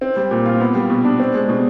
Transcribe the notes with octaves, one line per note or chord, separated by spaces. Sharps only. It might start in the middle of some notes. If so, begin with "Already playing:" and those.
C4
G3
A#2
F4
B3
G3
B2
D4
C4
G#3
B2